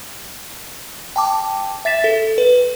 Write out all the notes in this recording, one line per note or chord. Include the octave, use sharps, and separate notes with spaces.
G5 A5 D6
E5 A6 B6 E7
A4
B4